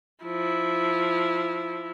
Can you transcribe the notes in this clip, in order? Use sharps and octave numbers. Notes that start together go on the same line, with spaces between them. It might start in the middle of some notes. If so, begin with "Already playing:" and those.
F3 E4